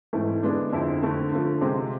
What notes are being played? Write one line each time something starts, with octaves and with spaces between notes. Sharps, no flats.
G#2 E3 A3 C4 E4
D3 G#3 B3 D4
F2 D3 G#3 C4 E4
D3 A3 C4
D3 F3 A3
C3 G#3 C4